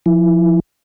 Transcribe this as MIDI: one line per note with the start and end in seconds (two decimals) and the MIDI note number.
0.06 0.60 53
0.06 0.60 64